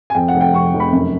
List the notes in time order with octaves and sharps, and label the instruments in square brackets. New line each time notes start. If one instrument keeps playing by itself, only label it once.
[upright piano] G#5
F2 G5
F#5
F1
G5
F1 C#6
F1
B5
F#2